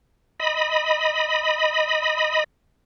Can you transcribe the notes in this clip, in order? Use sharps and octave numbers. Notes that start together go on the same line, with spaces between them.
D#5 B5